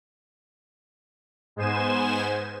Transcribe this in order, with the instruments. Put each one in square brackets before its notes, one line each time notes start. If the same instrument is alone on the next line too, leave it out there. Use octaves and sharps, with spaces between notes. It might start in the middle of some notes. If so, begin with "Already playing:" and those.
[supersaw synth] G#2 G#3 B3 C5 G#5 E7